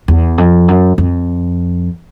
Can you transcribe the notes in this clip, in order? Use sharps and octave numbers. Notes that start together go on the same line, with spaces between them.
E2
F2
F#2
F2